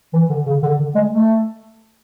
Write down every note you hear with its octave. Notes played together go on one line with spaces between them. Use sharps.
E3
D3
C#3
D3
D3
G#3
A3